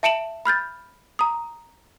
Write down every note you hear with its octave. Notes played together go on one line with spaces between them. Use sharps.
E5 A5 C#7 D7 E7 F#7
B5 F6 G6 A6
A#5 D#6